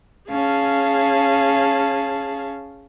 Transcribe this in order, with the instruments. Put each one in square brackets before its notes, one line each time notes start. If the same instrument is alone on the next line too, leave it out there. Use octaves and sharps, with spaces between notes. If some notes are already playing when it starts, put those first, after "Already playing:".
[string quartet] C#4 G#4 F5 A5